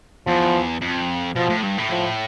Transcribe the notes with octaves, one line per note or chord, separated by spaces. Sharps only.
E2 F3
F2
B2 F3
A2
G2
A2
F3